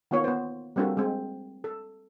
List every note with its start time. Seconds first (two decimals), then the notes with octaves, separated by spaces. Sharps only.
0.11 D#3 A#3 B3 F4 C#5
0.24 B3 C5
0.76 G3 A#3 C4 D4 F#4 A4
0.97 G#3 C4
1.64 A4